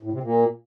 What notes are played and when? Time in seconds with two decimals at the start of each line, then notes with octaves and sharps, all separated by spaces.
0.03 A2
0.13 C3
0.23 A#2